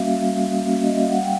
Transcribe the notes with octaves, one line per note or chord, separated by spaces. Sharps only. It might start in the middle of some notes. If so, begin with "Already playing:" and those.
Already playing: G3 A#3 C#4 F#4 E5 F5
G3
A#3 C#4 F#4
D#5
E5
F5
G3 F#5
G5